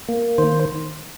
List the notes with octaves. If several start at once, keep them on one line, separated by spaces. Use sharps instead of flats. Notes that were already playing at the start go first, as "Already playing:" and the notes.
A#3
D#3 C5